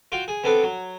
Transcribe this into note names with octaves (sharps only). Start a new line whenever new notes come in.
F4 F#4 G5
G#4
B3 C4 D4 A4 B4
F#3